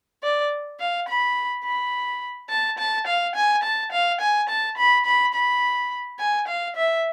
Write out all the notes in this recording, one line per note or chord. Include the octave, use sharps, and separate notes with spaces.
D5
F5
B5
B5
A5
A5
F5
G#5
A5
F5
G#5
A5
B5
B5
B5
G#5
F5
E5